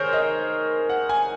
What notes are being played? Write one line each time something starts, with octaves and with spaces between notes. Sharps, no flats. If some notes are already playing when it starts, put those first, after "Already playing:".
Already playing: D#3 G#4 A#4 C5 C#5
D#5
F#5
G#5